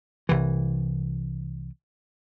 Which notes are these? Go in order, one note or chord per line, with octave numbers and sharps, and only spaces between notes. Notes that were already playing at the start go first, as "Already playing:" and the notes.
C2 E3